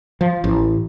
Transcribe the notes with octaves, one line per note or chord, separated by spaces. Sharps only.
F3
A1